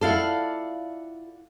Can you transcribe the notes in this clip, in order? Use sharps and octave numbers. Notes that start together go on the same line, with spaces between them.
E4 F4 A4 D5 F5 F#5